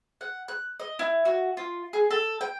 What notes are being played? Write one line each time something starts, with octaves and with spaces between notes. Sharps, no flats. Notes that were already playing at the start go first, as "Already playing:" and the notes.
F#5
F#6
D#5
E4
F#4
F4
G#4
A4
G5